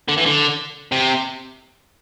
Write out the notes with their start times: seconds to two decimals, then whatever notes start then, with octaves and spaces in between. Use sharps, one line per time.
0.08 D3
0.17 E3
0.26 D3
0.92 C3